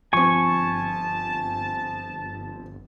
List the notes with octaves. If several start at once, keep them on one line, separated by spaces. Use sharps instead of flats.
G1 F3 C4 G#5 A5 C#6